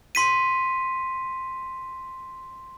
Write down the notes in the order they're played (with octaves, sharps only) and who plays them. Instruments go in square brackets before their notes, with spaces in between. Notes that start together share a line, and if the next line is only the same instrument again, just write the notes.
[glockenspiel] C6 B6 D#7